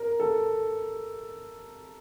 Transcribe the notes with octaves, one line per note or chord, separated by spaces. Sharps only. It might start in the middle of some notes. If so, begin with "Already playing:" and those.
Already playing: A#4
A4